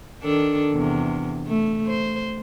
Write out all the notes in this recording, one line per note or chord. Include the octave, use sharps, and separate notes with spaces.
D#3 D4 A4
E2 C3
A3
C5